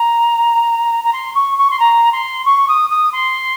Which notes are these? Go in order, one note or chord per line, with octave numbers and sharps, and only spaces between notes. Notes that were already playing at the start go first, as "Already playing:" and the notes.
Already playing: A#5
A#5
C6
C#6
C#6
C6
A#5
C6
C#6
D#6
D#6
C6